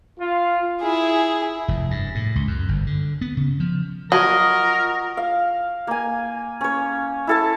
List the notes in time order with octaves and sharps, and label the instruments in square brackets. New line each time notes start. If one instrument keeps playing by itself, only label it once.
[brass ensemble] F4
[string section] E4 G#4
[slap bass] F1
G2
A2
C#2
F#2
G1
D3
B3
C#3
F3
[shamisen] F#3 [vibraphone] F4 F#5 C#6 [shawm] A#4 [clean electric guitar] D#5
[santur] F5
A#3 G#5
C#4 C#5
E4 A4 A5